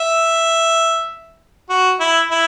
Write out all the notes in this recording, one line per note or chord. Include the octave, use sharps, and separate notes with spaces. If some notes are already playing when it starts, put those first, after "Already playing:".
Already playing: E5
F#4
E4
E4